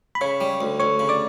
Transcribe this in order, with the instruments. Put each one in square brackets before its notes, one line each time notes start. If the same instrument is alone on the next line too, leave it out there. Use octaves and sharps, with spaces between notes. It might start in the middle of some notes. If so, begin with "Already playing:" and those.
[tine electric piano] B5
[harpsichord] C#3 [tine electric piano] C#5 C#6
[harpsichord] G3
D2
[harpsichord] D2 [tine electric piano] C#5 C#6
[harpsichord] C#3
[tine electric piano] D5 D6